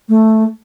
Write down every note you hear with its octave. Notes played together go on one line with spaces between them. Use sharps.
A3